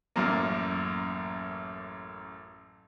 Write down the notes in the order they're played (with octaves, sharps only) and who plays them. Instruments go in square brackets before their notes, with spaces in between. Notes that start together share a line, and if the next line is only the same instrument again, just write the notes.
[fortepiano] A1 F#2 A#3